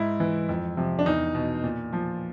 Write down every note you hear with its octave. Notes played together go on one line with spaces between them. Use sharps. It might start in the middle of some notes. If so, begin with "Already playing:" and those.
Already playing: G#2 E4
E3
F2
C3 F3
D4
E2 D#4
B2
A#2
F3